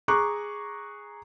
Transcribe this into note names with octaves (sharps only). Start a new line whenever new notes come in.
G#4 A#5 C#6 D6 F#6